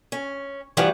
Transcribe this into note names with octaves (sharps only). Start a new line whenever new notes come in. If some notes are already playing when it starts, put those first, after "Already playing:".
C#4
D2 G2 E3 F3 G3 F#5